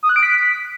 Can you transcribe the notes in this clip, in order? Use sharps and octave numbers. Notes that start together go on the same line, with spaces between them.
D#6
F#6
D7
B6